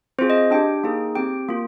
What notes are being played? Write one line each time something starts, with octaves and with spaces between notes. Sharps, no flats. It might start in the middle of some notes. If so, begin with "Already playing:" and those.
C4 F4 G#4 C5
D#5
D4 G4 G5
A#3 D#4 G#4
C4 G4 G5
A#3 F4